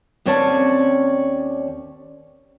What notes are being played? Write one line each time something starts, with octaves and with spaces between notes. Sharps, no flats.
D#2 C4 C#4 C#5 D5 A5